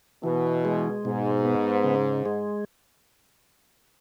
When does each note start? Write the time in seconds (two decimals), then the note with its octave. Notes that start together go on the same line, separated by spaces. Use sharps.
0.24 B2 E3
0.65 G#3
1.05 G#2 B2
1.45 B3
1.84 C#3
2.26 G#3